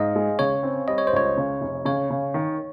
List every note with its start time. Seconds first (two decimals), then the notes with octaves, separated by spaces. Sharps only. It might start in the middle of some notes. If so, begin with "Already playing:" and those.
Already playing: G#2 D#5 F5
0.16 G#3
0.39 C#3 C#5
0.63 C4
0.88 G3 D#5
0.98 C#5
1.07 C5
1.13 C#2 C#5
1.37 C#3
1.61 F1
1.85 C#3 C#5
2.10 C#3
2.34 D#3